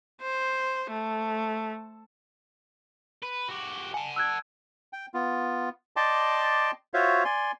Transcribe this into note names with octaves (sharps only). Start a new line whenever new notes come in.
C5
A3
B4
F#4 G4
F#5 G#5 A5
E6 F#6 G#6
G5
B3 F4
D5 D#5 G5 A5 C6 D6
F4 F#4 C5 C#5 E5 F5
D5 G#5 C6